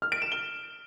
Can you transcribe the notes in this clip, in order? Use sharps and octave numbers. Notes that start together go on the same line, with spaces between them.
F6
D7
E7
G7